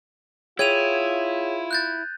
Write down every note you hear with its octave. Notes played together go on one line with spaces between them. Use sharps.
E4 F4 G#4 C#5 G5 G#6 D#7 F7
F#6 G6 A6